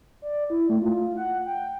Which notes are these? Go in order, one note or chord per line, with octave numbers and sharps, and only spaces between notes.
D5
E4
A3
F4
F4
F#5
G5